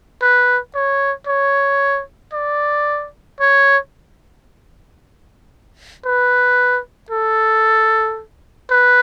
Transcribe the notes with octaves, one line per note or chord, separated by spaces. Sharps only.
B4
C#5
C#5
D5
C#5
B4
A4
B4